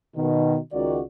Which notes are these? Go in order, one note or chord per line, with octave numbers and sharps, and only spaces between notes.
B2 D#3
C#2 D#3 F#4 D5